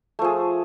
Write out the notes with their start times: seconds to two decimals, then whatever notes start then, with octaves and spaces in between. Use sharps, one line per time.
0.19 A3
0.22 F3
0.24 G#4